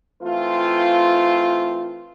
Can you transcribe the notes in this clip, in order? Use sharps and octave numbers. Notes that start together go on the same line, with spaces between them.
E3 A3 C4 F4